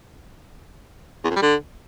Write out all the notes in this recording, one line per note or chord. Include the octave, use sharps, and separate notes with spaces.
E2
F2
G3
D3